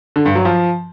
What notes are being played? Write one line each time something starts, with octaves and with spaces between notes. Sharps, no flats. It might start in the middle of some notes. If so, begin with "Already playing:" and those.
D3
G2
F#3
F3